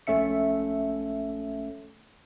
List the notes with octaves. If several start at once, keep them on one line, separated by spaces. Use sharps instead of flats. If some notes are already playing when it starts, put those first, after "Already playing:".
A#1 A3 C#4 E5 C#7